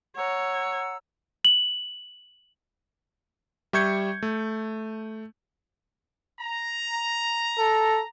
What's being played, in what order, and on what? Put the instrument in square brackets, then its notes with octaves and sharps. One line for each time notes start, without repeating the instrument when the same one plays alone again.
[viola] C#5 [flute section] F#5 A#5 E6
[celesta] F#7
[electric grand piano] G3 E5 C#6 G6 G#6 C#7
A3
[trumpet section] A#5
[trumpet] A4